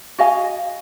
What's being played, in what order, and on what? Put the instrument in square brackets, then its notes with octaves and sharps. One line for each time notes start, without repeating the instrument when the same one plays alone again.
[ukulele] F#4 D#5 F5 G#5